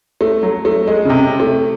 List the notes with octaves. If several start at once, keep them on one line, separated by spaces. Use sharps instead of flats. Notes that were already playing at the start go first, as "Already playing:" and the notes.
A3
F#3
A3
G#3
C#3
C3
A3